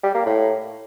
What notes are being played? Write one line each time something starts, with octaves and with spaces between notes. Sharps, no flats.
G3
A#3
A2